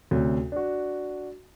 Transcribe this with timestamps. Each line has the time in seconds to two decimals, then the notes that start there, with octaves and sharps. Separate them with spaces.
0.11 D2 C3 C#4
0.52 D4 F#4